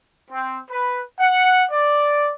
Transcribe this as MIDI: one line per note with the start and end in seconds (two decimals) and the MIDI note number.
0.30 0.58 60
0.70 1.01 71
1.18 1.64 78
1.71 2.33 74